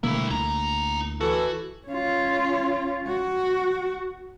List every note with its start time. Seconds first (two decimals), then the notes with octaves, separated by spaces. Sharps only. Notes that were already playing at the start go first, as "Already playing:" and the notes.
0.03 B2 D3 G3 A3 A#3 E4
0.30 D2 E4 A#5
1.21 E3 F#4 A4
1.88 C#4 F4
3.07 F#4